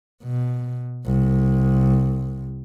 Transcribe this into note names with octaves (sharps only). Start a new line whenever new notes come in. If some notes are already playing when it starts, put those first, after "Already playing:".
B2
C2